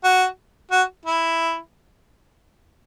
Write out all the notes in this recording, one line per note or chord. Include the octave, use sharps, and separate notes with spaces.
F#4
F#4
E4